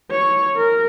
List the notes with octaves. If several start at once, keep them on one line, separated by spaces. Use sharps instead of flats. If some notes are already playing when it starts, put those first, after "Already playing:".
C#5
A#4